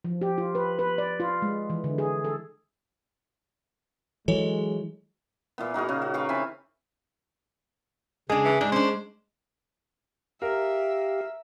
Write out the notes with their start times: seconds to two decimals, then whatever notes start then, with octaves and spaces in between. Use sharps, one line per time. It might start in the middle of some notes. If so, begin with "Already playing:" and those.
0.05 F3
0.21 G4
0.38 F4
0.55 B4
0.79 B4
0.98 D5
1.20 F4
1.42 G#3
1.70 E3
1.84 D3
1.98 G#4
2.25 A4
4.28 E3 F#3 G#3 A4 C#5
5.58 A#2 E3 B3
5.74 D#4 F#4 G#4 A#4
5.89 C#3
6.02 F#4
6.14 G4 B4 F5 C#6
6.29 E3 C4 G#5 B5
8.30 C#3 G#3 D4 G#4
8.45 E3
8.61 G#2 G#3 D4
8.72 C#4 D4 C5
10.42 G4 A#4 E5 F5